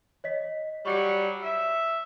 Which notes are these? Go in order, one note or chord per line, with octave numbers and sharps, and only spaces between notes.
C#5 D#5 B6
F#3 G3 C#6 C#7
E5